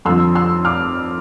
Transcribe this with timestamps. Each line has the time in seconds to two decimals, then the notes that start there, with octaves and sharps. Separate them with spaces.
0.05 F2 D3 F3 C6 E6
0.35 C6 E6
0.65 D6 F6